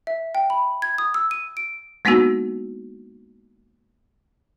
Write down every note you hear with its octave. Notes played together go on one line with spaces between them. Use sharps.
E5
G5
B5
G#6
D#6
E6
D#7
D7
G#3 A#3 B3 D4 D#4 F#4